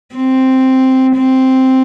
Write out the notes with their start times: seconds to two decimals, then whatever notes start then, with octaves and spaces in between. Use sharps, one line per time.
0.15 C4
1.16 C4